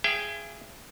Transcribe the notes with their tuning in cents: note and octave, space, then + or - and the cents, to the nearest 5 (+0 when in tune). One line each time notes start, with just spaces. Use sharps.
G#4 +0 E5 +45 G5 +0